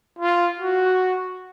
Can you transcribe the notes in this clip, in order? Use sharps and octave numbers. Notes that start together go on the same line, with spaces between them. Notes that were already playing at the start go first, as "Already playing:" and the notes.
F4
F#4